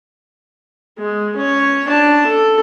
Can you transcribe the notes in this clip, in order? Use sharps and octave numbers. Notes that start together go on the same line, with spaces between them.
G#3
C#4 C#5
D4 A5
A4